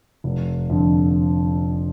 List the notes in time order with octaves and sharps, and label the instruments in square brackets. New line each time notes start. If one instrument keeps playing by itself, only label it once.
[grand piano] F1
F2 D3